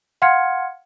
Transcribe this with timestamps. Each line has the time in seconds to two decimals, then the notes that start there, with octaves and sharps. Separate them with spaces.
0.22 F5 F#5 C6 F6 G#6 C#7